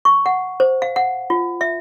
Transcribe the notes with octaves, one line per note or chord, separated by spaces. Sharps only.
C#6
F#5
C5
F5
F#5
F4
E5